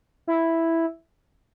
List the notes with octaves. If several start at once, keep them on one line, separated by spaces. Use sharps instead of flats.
E4